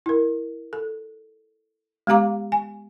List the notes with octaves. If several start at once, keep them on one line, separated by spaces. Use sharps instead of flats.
E4 A#4
A4
G#3 B3 G4 F5 A#5 D6
G#5